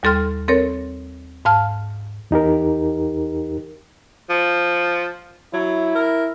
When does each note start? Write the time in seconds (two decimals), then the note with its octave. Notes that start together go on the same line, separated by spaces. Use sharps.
0.03 D#2 G3 A4 C6 F6
0.48 C4 A4 A#4 C#5
1.45 G#2 F5 A5 F6
2.31 E2 D#4 G4 A#4
4.30 F3
5.54 F#3 E4
5.95 A#4